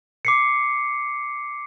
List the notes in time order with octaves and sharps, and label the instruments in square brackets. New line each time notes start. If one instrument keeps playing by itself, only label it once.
[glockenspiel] D6 C7 C#7